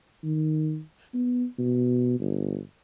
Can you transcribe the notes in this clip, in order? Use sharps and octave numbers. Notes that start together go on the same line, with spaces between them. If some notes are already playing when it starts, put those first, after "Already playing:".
D#3
B3
B2
G1